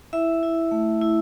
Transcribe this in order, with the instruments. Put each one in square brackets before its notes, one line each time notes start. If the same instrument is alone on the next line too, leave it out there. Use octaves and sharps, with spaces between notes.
[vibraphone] E4 E5
E4
A3
E4